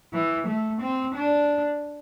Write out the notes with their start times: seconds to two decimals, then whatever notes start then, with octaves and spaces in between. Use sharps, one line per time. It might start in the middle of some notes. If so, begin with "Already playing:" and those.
0.13 E3
0.47 A3
0.81 C4
1.14 D4